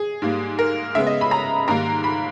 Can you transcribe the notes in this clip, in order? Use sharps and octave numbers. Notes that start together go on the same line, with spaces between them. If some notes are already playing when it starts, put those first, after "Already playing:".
Already playing: G#4
G#2 G3 A#3
A#4
C#3 G#3 B3 E5
D#5
B5
A#5
G#2 D#3 G3 A#3 A#5
B5